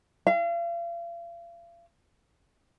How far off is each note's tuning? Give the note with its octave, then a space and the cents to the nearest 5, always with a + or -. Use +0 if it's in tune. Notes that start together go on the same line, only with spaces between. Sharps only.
F5 -40